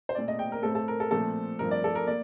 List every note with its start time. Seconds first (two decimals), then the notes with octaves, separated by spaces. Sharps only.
0.09 C5
0.15 A#2 A3 C4 D5
0.28 D#5
0.39 G5
0.52 A#4
0.63 A2 A3 C4 A4
0.75 A4
0.88 A#4
1.00 A4
1.11 A#2 F3 A3 C4 A4
1.59 G2 F3 A3 C4 A#4
1.71 D5
1.84 A4
1.95 A#4
2.07 A#3 D5